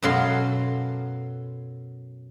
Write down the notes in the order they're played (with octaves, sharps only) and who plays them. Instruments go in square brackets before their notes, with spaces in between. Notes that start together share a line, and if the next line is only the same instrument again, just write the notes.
[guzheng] F#2 B2 F#3 A4 F5 C6